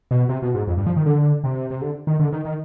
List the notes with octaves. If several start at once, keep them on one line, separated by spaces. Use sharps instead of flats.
B2
C3
B2
G#2
F2
G2
F3
D#3
D3
C3
C3
D3
D#3
D3
D#3
D#3